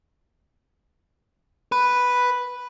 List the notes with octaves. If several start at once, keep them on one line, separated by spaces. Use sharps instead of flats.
B4